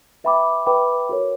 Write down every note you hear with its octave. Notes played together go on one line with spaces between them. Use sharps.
B4 E5 G5 B5 D6
B4 E5 G5 B5 D6
F#4 A#4 C#5